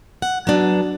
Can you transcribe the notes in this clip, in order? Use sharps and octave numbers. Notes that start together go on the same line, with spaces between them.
F#5
F#3 B3 D4